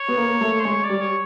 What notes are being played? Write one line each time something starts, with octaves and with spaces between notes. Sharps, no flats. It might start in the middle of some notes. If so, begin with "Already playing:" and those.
Already playing: C#5
B3
A#3
A3
C5
G#3 C#5
D5
G3
C#5